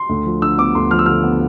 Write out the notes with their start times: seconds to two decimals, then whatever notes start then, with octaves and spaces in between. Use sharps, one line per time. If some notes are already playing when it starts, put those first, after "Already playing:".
Already playing: C6
0.09 D2
0.26 F3
0.42 D3 E6
0.58 B3 D6
0.75 D2 C6
0.91 F3 F6
0.99 E6
1.06 D3 F6
1.24 B3